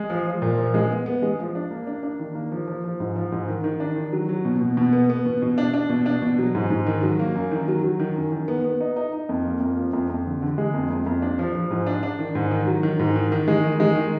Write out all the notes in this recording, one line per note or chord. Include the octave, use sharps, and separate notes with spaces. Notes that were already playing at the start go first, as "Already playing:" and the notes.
Already playing: G#3
F3
F3
A#2
F3
G#3
B3
B3
G#3
F3
D4
A#3
D4
D4
D#3
A#3
F3
F3
F3
G#2
F3
G#2
D#3
D#3
D4
D#3
F#3
F#3
B2
B2
B2
B3
B3
B2
B2
D4
D4
B2
D4
B2
F#3
G#2
G#2
D#3
F#3
A#3
F#2
D#3
F#3
F#3
D#3
F#2
D#3
B3
B3
D#4
D#4
D#4
F2
A#3
F2
F3
F2
F2
D3
D3
G#3
F2
F2
F2
D4
F3
F3
G#2
D4
D4
D#3
G#2
D#3
F#3
D#3
G#2
D#3
D#3
G#3
D#3
G#3
D#3